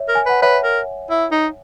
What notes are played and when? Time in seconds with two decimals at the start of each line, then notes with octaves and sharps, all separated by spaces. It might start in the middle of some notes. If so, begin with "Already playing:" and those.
Already playing: C#5 E5
0.09 A#4
0.15 G#5
0.26 B4 F#5
0.42 B4 C#5 E5
0.64 A#4
1.10 E4
1.32 D#4